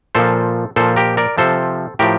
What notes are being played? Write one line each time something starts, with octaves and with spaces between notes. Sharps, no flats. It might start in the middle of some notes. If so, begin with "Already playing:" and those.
A#2 F3 A4 C5
A#2 F3 A4 C5
G4 A#4
A#4 D5
C3 F3 A4 C5
A2 F3 G4 A#4